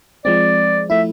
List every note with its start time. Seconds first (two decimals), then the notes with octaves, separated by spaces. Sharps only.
0.25 F3 G#3 C4 D5
0.90 F3 A3 E4 E5